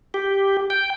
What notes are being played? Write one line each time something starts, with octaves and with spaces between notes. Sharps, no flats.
G4
G5